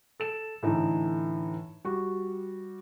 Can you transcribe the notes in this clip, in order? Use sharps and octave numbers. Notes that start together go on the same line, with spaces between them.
A4 E7
A2 D3 E3 D#4
G3 F#4